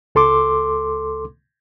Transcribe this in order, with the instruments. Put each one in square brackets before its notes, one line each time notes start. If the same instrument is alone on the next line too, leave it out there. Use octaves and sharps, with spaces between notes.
[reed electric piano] C#2 A4 C6 D6